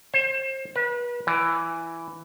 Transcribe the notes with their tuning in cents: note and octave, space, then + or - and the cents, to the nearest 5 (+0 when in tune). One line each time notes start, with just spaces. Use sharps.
C5 +30
B4 -35
E3 +10